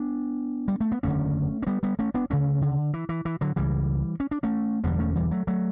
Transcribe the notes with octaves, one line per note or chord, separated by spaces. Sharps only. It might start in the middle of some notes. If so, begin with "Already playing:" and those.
Already playing: B3 D4
G3
A3
B3
F#1 E2 D3 A3 C#4
C#4
G3 B3
G3 B3
A3 C#4
B3 D4
D2 C#3 A3 C#4
D3
E3
E3
E3
D3 F#3
C#2 C#3 E3 G3
C#4
D4
A3 C#4
E1 E2 D3 G3 B3
A3 C#4
E3 G3
F#3 A3
F#3 A3